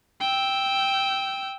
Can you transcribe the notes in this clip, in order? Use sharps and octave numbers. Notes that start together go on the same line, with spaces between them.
G5 E6